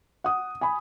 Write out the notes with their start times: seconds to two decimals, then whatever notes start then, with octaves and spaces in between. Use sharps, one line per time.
0.24 F#5 D#6
0.61 G#5 B5